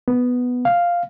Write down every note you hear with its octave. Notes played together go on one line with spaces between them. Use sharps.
B3
F5